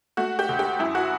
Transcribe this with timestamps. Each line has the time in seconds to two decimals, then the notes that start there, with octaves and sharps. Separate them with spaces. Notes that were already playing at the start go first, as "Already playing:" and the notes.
0.17 A3 F#4
0.39 G4
0.49 D2
0.59 G4
0.79 F#2 E4
0.95 F#4